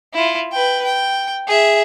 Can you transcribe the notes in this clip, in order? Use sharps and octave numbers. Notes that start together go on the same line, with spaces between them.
E4 F4
B4 G5
G5
G#4 E5